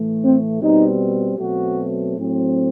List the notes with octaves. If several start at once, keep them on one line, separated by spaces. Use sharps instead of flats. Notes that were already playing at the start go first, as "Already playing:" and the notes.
Already playing: A2 E3 A3
C4
B2 G3 C4 D#4
B2 F#3 A3 C4 F#4
A2 F#3 C4